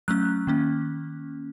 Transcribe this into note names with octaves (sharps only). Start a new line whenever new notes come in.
F#3 A3 C#4 F#6
D#3 A#3 C#4